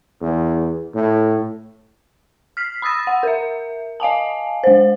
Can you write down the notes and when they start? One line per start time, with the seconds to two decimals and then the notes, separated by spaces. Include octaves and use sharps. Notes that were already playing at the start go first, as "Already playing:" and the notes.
0.21 E2
0.95 A2
2.57 F6 B6 C7
2.82 B5 D#6 E6 A6 A#6
3.07 F#5
3.23 A#4 E5
4.00 D#5 F5 G#5 A5
4.64 G#3 C5